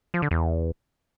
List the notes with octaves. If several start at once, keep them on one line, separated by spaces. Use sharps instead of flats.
F3
D3
E2